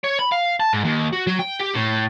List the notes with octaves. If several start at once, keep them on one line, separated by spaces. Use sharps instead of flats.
C#5
B5
F5
A5
G#2
D#2
F#4
F#3
G5
G4
A2